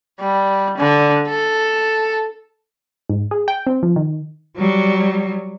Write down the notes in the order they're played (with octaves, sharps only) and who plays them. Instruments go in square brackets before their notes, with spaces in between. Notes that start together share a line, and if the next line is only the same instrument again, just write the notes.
[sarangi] G3
D3
A4
[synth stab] G#2
G#4
G5
C4
F3
D#3
[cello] F#3 G3